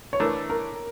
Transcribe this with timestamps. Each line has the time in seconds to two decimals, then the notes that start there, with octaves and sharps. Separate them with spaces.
0.13 C#5
0.20 E3 A3 D4 A#4
0.50 A#4